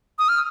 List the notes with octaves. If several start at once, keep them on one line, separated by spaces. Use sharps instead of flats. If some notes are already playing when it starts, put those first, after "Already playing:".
D#6
F6